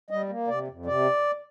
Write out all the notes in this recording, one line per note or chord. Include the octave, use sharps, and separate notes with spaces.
G3 D#5
A#3
C3 D5
F2
C3 D5